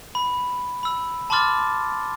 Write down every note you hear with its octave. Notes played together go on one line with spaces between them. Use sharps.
B5
B5 E6
A5 B5 C6 D6 F6 A6